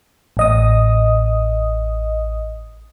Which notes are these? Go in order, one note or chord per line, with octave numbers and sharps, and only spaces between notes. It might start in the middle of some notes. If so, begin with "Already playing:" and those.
A1 D#5 D#6